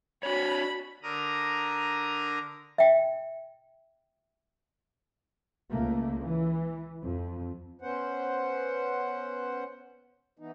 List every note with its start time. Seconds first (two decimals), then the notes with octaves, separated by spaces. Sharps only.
0.23 D4 F#4 C#5 B5
1.03 D3 A#4 A#5 D#6
2.78 E5 G5
5.71 C#2 A3 A#3
6.21 E3
7.03 F2
7.81 B3 C#4 C5 F#5
10.39 E3 B3 D#4